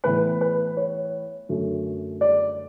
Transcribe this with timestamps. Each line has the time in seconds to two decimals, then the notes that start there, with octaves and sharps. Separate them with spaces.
0.04 A2 E3 B3 B4
0.41 B4
0.77 C#5
1.49 F#2 D3 F#3 A3 C#4
2.21 D5